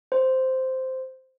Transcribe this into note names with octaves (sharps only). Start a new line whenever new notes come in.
C5